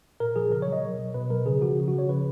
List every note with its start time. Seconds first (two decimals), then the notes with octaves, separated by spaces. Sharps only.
0.20 A#2 A#4
0.36 F3 G#4
0.52 C#3 A#4
0.62 C#5
0.68 F#3 D#5
0.83 B2
0.99 F#3
1.14 B2 B4
1.30 F#3 A#4
1.46 C#3 G#4
1.62 F3 F#4
1.78 C#3
1.88 F#4
1.93 F3
1.99 C#5
2.09 C#3 B4